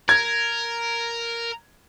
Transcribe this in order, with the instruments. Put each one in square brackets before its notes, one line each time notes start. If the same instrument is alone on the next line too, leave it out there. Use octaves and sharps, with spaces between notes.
[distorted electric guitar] A#4 [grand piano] G#6